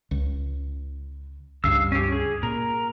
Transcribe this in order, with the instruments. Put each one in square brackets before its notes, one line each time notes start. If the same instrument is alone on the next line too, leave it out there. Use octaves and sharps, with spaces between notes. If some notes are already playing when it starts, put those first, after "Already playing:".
[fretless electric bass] C#2
[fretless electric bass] C#2 G2 [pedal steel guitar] F5 E6
[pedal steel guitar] C#4 G4
G#4
[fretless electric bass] A#2 [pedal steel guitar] A#4